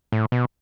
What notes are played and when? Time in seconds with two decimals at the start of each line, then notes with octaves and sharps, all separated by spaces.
0.12 A2
0.32 B2